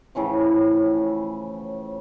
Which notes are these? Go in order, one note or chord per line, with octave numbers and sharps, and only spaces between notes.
A2 C#3 E3 F3